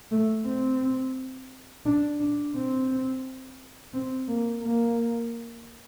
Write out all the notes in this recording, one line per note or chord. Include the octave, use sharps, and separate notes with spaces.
A3
C4
D4
D4
C4
C4
A#3
A#3